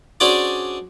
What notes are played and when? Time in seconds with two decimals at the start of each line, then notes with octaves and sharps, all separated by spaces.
0.20 C#4 D4 F#4 G#4 C5 D5